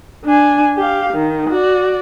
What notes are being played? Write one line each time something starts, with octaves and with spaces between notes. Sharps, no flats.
D4 G#5
G4 F5
D#3
F#4 D5